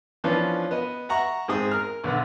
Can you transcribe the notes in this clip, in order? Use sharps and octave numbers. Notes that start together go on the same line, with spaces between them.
E3 F3 B3 C#4 D4 F4
B3 D#5
E5 F#5 A#5 C#6
G#2 C4 G#4 D#6
A#4 F6
B1 D3 B4 F#5